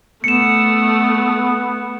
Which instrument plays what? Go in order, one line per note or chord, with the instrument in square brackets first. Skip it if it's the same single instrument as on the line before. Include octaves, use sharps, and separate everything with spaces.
[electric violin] A3 [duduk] B3 [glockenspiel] C#7 E7